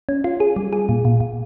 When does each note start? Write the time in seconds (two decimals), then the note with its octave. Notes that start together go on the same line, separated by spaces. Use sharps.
0.09 C#4
0.24 F4
0.40 G#4
0.56 G3
0.73 G#4
0.89 A#2
1.05 A#2
1.20 A#2